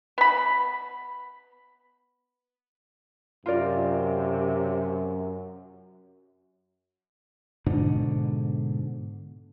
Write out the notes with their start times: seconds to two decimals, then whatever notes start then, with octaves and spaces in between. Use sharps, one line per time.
0.18 B3 B5
3.46 F#2 C3 F4 A#4 D5
7.66 G#2 B2 D3